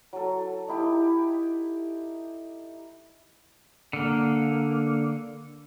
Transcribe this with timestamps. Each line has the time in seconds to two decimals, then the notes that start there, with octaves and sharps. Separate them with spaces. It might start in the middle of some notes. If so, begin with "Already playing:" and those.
0.13 F#3 A4
0.68 D#4 E4 G4
3.93 D3 A#3